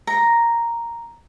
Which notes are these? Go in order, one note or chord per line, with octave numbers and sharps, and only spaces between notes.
A#5